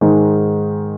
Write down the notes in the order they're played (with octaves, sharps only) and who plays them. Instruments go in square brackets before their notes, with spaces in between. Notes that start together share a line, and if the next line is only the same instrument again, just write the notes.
[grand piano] G#2 D#3 G#3